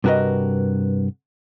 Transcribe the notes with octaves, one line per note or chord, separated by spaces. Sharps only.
G2 C3 F#4 A#4 B4 D#5